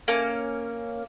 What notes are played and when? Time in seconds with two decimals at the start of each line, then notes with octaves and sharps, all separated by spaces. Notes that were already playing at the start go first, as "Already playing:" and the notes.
0.08 A#3 C#4